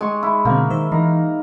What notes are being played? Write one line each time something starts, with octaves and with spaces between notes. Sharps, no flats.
G#3 G4 G#5 C#6
E4
B2 D3 A#3 C4
D#3 C5 E6
E3 D#4 A#4